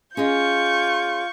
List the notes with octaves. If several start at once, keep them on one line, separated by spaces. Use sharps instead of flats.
C#4 F4 G#4 D#5 C#6 G6